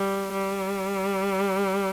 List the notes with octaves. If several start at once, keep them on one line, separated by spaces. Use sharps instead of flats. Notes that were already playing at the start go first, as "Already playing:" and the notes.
Already playing: G3
G3